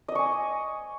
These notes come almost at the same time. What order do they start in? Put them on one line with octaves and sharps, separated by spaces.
D#5 D6 C#6 G#5